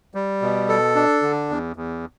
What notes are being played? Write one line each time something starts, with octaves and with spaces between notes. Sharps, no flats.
G3
B2
A4
D4
D3
E2
E2